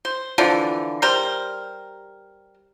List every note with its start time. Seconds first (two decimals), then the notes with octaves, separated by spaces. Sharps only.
0.05 C5
0.38 D3 E3 F3
1.02 G3 A#4 C5